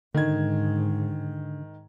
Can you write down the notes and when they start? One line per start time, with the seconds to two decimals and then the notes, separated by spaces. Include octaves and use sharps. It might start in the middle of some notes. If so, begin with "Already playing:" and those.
0.15 G#2 D3 D#3 G#6